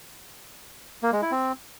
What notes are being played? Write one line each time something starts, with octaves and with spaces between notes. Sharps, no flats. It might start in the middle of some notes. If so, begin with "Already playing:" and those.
A#3
G#3
E4
C4